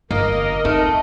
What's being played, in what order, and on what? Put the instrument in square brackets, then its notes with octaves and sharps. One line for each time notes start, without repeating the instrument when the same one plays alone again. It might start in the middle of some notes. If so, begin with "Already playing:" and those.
[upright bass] G1 [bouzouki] A#3 [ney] A#4 [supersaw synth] D#5
[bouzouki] A3 [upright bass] C4 D#4